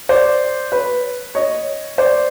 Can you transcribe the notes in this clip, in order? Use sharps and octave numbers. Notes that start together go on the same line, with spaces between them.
C5 D5
B4 C#5
C#5 D#5
C5 D5